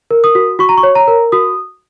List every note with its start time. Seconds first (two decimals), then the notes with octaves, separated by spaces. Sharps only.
0.11 A#4
0.24 D#6
0.35 F#4
0.59 F#4 C#6
0.69 A#5
0.77 C#6
0.83 C#5
0.95 A#5
1.08 A#4
1.32 F#4 D#6